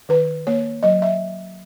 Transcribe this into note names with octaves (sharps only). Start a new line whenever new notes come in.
D#3 B4
A#3 C#5
F#3 D#5
E5